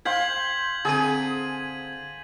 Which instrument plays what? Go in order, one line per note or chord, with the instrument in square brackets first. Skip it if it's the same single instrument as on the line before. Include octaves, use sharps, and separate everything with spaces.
[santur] C5 F5 G5 [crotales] G#6 B6 F#7
[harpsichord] D3 C4 A#4 [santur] G#4 [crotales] A6 D#7